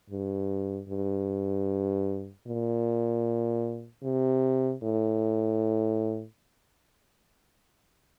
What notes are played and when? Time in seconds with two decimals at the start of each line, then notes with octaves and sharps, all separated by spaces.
0.10 G2
0.89 G2
2.47 A#2
4.03 C3
4.83 A2